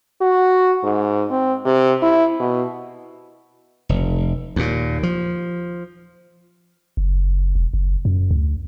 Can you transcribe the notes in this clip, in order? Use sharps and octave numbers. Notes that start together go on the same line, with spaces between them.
F#4
G#2
C4
C3
E4
B2
F1
D#2 A#2
F3
F#1
E1
F#1
F#2
D2